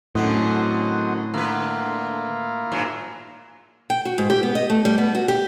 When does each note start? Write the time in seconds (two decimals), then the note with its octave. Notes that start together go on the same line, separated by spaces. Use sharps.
0.15 F#2 A2 D3 F#3 B3 C4 D#5
1.34 D3 A#3 E4 F4 B4
2.72 G2 A#2 F#3
3.90 G5
4.05 F#4
4.18 G#2
4.30 G4
4.43 B3
4.55 D#5
4.70 A3
4.85 G3
4.98 B3
5.15 F#4
5.28 G4